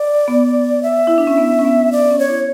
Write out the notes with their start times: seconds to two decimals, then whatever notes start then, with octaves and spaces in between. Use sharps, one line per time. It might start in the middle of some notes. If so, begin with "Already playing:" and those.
Already playing: D5
0.28 B3
0.83 E5
1.07 E4
1.18 D4
1.27 C#4
1.38 B3
1.59 C#4
1.65 B3
1.92 D5
2.10 C#4
2.19 C#5
2.29 E4